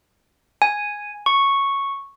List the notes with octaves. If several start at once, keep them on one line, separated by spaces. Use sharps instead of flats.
G#5
C#6